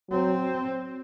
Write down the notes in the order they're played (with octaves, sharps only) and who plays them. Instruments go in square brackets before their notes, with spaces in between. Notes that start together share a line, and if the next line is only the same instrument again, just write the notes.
[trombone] F#3 [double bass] C4